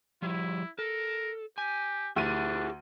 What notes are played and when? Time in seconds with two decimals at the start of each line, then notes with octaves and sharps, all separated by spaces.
0.22 F3 G3 E4
0.79 A4 A#4
1.58 G4 G#5
2.16 D2 D4 E4 G4 G#4 D#7